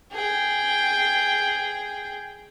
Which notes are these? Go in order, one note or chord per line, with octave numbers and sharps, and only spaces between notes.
G#4 G5